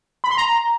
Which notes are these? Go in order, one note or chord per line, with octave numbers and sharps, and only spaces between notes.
B5
C6
A#5